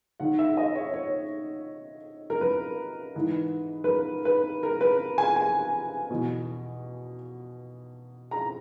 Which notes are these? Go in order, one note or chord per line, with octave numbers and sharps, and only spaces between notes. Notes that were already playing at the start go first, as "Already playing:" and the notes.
D#2 D#3 F#5
E5
D#5
C#5
C#5
A#4
B4
G#2 E3
B4
A#4
B4
A#4
B4
G#5
G#5
E2 B2
A#5